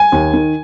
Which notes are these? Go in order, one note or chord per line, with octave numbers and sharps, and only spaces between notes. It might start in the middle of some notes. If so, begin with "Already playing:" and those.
Already playing: G#5
D#2
D#3